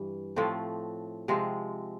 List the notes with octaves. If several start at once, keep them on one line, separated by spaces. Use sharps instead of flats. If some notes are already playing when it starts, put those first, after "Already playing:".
Already playing: G2 E3
A2 F3 A3 C4
C3 F3 G#3 C4